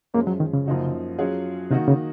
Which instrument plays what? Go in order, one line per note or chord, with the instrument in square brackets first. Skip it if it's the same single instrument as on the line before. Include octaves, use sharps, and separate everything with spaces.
[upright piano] F#2 F3 G#3 C#4 [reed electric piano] A#3
[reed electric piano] F#3
D#3
C#3
[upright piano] F#2 F3 A#3 D#4 F#4
F#3 C#4 F4 G#4
[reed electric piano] C3 [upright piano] D#3 A#3 D#4 F#4
[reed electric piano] C#3